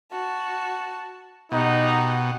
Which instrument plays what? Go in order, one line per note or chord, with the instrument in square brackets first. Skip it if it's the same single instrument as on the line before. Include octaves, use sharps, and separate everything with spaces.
[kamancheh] F#4 A5
[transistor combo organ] B2 [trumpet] D#4 [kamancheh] G4 F#5